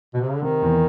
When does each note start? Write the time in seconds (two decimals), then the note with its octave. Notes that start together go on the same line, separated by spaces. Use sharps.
0.14 B2
0.21 C3
0.28 C#3
0.35 D3
0.42 C3 D#3
0.62 E2